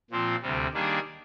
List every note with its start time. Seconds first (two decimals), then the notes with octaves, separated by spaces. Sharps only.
0.10 A#2 F3 C4 F4
0.42 D2 C3 G3
0.74 D#3 G3 A#3 D4 G#4